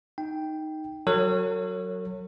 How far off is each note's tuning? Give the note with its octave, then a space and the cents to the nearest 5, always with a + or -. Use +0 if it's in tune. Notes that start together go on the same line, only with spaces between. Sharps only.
D#4 +0 G5 +0
F#3 +0 A#4 -45 C#5 -20